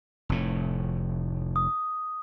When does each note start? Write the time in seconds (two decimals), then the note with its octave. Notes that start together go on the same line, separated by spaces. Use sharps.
0.29 F1 A2
1.56 D#6